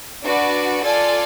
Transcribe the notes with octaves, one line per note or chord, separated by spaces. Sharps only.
D4 F#4 B4 D5
F4 A4 D5 G#5